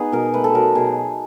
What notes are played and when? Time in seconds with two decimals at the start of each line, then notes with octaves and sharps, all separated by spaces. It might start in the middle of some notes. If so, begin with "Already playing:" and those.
Already playing: B3 D#4 G#4
0.12 B2 A#4
0.34 A3 B4
0.44 A4
0.55 F#3 A#4
0.75 B2 G#4